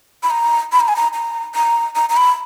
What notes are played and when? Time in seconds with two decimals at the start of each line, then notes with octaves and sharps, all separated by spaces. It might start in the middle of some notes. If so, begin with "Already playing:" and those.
0.23 B5
0.30 A#5
0.72 B5
0.80 A#5
0.88 G#5
0.96 A#5
1.14 A#5
1.55 A#5
1.96 A#5
2.10 A#5
2.17 B5